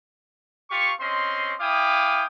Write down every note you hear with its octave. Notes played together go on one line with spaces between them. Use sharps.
F4 G4 F5 C#6
C4 C#4 D#5 C6
E4 F5 G5 G#5 D6 D#6